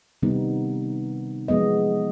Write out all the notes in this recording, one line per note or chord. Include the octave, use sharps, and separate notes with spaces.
C3 D#3 G3 B3 D#4
F3 F#3 G#3 B3 D#5